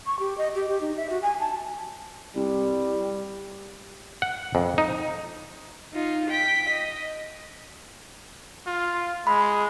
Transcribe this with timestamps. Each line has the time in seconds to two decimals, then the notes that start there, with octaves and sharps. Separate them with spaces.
0.06 C#6
0.19 G4
0.38 D#5
0.55 G4
0.68 G4
0.81 D#4
0.97 E5
1.10 F#4
1.22 G#5
1.40 A5
2.36 C2 G3
4.22 F#5
4.55 F2
4.78 D#4
5.93 D#4 F4
6.30 G5 B6
6.69 D#5
8.67 F4
9.27 G#3 B5